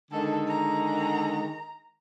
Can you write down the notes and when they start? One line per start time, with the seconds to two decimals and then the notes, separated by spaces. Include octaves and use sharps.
0.12 D3 D#3 G#3 A4
0.48 A#5